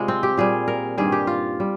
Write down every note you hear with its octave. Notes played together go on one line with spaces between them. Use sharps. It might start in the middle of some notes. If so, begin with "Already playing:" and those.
Already playing: C3 G3 G#3 F4
C4
G4
A#2 G3 G#4
A#4
G2 D#3 G3 G#4
G4
F4
G3